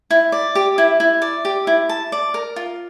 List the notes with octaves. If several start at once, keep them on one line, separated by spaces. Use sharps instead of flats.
E4
D5
G4
E4
E4
D5
G4
E4
A5
D5
A#4
F4